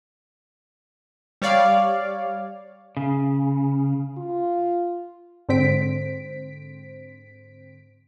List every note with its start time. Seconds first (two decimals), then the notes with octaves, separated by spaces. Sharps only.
1.42 G3 C#5 D5 F5
2.97 C#3
4.18 F4
5.49 G#2 D3 C4 C5 B6 D7